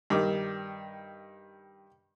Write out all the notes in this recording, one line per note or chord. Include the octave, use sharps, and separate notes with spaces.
G2 D#3 D6